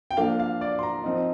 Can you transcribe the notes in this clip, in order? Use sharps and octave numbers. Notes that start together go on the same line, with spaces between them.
G5
F3 A#3 D4 F5
F5
D5
C6
A#5
F3 C4 D#4